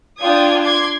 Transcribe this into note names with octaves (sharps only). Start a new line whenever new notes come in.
D4 F4 G5 D#6 G#6
C6 D6 G#6